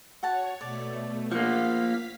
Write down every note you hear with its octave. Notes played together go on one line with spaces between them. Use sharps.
F#4 C#5 F#5 A5
B2 A3 D5
F3 A#3 F5 F#5 B6